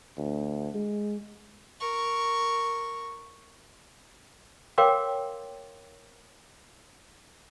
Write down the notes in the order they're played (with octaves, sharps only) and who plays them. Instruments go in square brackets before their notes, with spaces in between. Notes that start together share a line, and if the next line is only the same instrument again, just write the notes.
[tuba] D2
G#3
[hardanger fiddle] A#4 C#6
[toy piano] A#4 C#5 F5 G5 C6 D6